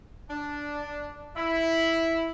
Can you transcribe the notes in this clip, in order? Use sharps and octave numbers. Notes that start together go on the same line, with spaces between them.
D4
E4